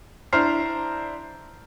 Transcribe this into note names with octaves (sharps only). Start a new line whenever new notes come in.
D4 E4 C5 A#5 F6 C7